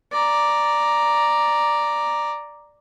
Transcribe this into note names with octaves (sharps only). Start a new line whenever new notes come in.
D5 A#5